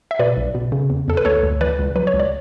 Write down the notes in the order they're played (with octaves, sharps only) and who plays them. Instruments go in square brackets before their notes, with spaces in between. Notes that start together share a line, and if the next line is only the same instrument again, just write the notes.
[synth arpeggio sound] E5
B2 B4 D5
B1
B2
C#3
E2
E2 A4
B4
D2 A4 C#5
D2
E3 B4 D5
C#2
F#3 B4
C#5
C#2
D5